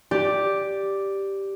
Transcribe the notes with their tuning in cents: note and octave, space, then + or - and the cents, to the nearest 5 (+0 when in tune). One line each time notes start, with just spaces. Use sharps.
G4 +0 D5 +0